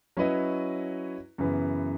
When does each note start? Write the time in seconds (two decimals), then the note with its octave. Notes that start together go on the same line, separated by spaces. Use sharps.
0.17 F#3 C#4 E4 B4 D#5
1.38 F#2 C#3 E3 B3